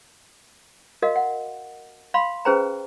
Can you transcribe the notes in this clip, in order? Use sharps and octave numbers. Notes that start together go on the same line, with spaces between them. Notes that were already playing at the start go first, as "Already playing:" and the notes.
F#4 A#4 D#5 F5
F#5
F5 B5 C6
C#4 G#4 B4 C5 G5 A#5